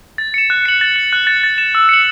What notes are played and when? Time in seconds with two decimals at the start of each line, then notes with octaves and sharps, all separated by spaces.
0.18 A6
0.34 C#7 E7
0.50 F#6
0.66 C#7 F#7
0.81 A6
0.96 F#7
1.13 F#6
1.27 A6 F#7
1.43 A6
1.58 E7
1.75 E6
1.89 C#7 F#7